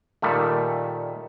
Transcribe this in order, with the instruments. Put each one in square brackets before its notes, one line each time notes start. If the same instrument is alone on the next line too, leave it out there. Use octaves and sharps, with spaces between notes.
[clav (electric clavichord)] A#2 D#3 G3 A3